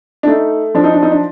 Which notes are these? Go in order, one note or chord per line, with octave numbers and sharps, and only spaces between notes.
D4
A3 D#4
F3 D4
D#4
D4
D#4
D4